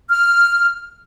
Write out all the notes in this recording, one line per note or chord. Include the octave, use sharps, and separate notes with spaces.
F6